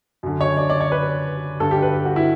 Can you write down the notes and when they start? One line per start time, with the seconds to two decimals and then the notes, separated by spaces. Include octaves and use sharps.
0.23 F#2 D3
0.41 C#5
0.57 D5
0.70 D5
0.81 C#5
0.92 B4
1.60 G2 D3 A4
1.71 G4
1.82 B4
1.94 G4
2.05 F#4
2.16 E4